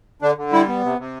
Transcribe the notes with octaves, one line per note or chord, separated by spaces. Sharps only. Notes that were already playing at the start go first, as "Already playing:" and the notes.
D3 D4
D3
G3 E4
B3
C3
C3